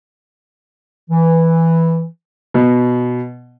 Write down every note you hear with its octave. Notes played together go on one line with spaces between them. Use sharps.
E3
B2